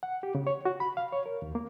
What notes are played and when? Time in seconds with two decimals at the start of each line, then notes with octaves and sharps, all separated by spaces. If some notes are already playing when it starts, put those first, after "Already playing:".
0.03 F#5
0.23 G4
0.35 C#3
0.47 C#5
0.65 F#4
0.80 B5
0.97 F5
1.12 C#5
1.26 A#4
1.42 D#2
1.55 A#3